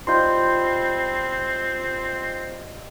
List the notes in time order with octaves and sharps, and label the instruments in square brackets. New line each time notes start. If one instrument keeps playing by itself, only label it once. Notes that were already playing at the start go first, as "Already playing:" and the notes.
[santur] G3 D#4 F4 [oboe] C4 [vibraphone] C5 [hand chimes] C6 G6